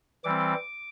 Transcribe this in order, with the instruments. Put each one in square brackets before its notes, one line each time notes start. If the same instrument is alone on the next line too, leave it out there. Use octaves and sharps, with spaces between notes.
[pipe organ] E3 G3 C4 D6